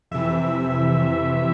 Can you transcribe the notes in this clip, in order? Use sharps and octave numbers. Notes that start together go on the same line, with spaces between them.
F2 C3 E3 E5